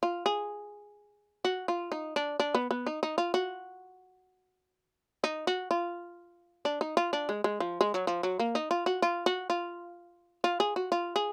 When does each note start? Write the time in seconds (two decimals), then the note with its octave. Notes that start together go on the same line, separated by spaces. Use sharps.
0.03 F4
0.26 G#4
1.45 F#4
1.68 F4
1.92 D#4
2.16 D4
2.40 D4
2.55 B3
2.71 B3
2.87 D#4
3.03 D#4
3.18 F4
3.34 F#4
5.24 D#4
5.47 F#4
5.71 F4
6.65 D4
6.81 D#4
6.97 F4
7.13 D4
7.29 G#3
7.44 G#3
7.60 F3
7.81 G#3
7.94 F#3
8.07 F3
8.23 F#3
8.39 A#3
8.55 D#4
8.71 F4
8.86 F#4
9.02 F4
9.26 F#4
9.50 F4
10.44 F4
10.60 G#4
10.76 F#4
10.92 F4
11.16 G#4